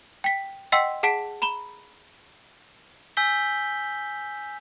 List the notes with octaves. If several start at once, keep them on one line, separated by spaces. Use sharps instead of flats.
G5 B6
D#5 F#5 G5 C6 E6 B6
G#4 F#5 A5 B6 D7
A#5 B5 E7 G7
G#5 E6 G6 B6 G7